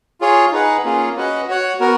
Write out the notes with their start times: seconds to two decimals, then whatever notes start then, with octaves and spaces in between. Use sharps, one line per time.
0.21 F4 G#4 C#5
0.52 D#4 G#4 B4 F#5
0.84 A#3 C#4 F4 G#4
1.16 C#4 F#4 B4 D#5 F#5
1.47 F#4 C#5 F#5
1.80 B3 F#4 A#4